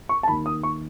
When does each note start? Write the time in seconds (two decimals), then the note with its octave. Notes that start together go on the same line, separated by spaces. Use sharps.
0.09 C#6
0.23 A5
0.28 D#2 D#3 B5
0.46 D#6
0.63 C#6